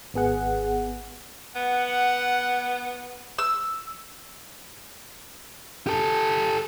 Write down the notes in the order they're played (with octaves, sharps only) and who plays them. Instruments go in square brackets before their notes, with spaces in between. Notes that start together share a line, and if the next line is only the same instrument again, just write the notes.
[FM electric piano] G#1 B3 G#4 F#5
[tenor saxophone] B3 [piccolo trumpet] F#5
[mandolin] E6
[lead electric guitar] G4 A4